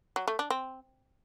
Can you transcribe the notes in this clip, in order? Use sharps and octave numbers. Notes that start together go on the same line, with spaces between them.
F#3
A3
D4
C4